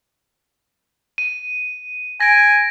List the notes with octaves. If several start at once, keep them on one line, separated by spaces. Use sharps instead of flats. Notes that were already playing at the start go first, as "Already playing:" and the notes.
D#7
G#5 A#6 D7